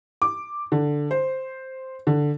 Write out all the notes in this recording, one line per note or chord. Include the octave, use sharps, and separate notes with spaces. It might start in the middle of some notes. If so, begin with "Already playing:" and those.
D6
D3
C5
D3